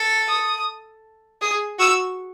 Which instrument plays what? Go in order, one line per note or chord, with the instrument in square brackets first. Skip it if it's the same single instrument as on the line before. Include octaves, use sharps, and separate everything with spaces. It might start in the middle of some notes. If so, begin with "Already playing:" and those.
Already playing: [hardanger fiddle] A4
[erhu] D#6
[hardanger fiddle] G#4 [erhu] D#6
[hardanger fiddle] F#4 [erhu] E6